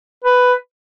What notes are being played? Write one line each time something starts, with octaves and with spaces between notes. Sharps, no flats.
B4